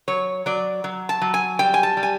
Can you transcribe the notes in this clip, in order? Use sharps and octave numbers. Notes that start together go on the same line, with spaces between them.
F#3 C#5
F#3 D5
F#3
A5
F#3
G#5
G3 G5
G#5
A5
G3
G#5